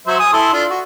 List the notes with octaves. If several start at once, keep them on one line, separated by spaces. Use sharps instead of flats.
F#3 C5 E5
G#5 D#6
E4 A4 C6
D4 F4 A4
F#4